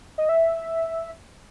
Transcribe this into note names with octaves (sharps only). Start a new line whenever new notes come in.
D#5
E5